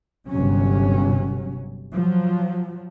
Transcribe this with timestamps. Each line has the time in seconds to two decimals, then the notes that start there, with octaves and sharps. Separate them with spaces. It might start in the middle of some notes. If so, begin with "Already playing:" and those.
0.28 G1 C3 F#3 C#4
1.94 F3 F#3